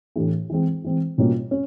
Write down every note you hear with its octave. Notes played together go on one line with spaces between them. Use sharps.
A2 E3 A3 D4 G4
E3 G#3 C4
E3 G#3 C4
B2 G3 A#3 C#4 F4
C#4